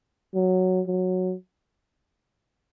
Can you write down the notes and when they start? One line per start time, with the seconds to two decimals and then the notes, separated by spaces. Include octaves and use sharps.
0.35 F#3
0.87 F#3